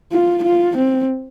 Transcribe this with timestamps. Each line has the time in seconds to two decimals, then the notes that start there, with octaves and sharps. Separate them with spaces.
0.12 F4
0.44 F4
0.77 C4